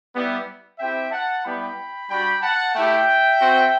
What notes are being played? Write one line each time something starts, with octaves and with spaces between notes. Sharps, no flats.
G3 B3 E4
C4 E4 G4 E5 G5
F#5 A5
G3 B3 E4 G4 G5 B5
G3 D4 F#4 G5 B5
F#5 A5
A3 E4 G4 E5 G5
C4 F#4